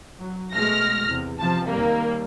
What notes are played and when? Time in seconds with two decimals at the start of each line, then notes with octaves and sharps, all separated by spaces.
0.19 F#3
0.53 B2 G#3 A3 F6 A#6
1.08 E2 C3
1.38 C3 F3 A5
1.68 D#2 G3 A#3